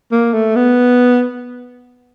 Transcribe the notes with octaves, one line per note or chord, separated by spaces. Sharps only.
A#3
A3
B3